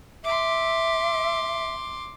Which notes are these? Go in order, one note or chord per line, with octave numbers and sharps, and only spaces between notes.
E5 C6 D6